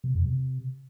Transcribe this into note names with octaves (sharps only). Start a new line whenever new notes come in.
C3
F2
C3